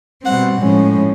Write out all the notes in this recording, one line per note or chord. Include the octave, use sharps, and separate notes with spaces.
B2 G3 C4 F#5
A2 F3 G#3 C#4